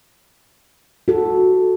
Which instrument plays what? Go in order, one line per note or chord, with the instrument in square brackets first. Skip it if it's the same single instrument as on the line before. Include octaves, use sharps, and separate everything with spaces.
[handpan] F#4 A4